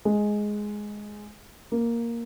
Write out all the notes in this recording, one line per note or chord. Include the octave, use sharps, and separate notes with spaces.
G#3
A#3